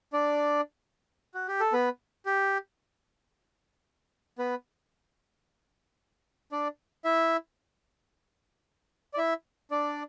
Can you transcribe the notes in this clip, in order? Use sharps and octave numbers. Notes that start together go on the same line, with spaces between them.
D4 D5
F#4
G4
A4
B3 B4
G4
B3 B4
D4 D5
E4 E5
D5
E4 E5
D4 D5